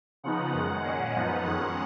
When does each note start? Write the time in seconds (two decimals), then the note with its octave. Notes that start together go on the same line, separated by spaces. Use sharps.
0.24 C#3 F3 B3 D#4 F#5
0.53 F#2 D#3 G#3 F#5
0.84 A#2 G#3 C#4 F#5
1.14 F#2 F3 B3 D#4
1.44 F2 D#3 G#3 C#4 F#5